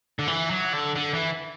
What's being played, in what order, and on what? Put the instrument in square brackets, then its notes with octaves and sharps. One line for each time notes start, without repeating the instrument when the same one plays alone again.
[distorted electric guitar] D3
E3
F#3
D3
D3
E3